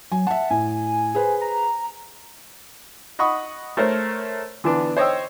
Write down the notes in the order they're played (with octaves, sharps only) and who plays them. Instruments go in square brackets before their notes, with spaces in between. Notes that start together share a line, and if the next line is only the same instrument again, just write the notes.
[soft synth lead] F#3 [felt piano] G#5
[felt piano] E5 A5 [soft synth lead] F#5
[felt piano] A2 [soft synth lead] G#5
[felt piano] G#4 B4 C5
[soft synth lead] A#5
[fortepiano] D#5 F#5 B5 C#6 D#6
A3 A#4 C5 C#5
D3 E3 B3 D4
C5 C#5 D#5 G5 E6